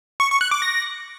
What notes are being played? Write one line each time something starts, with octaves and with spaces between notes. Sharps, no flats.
C#6
C#6
F#6
D6
A#6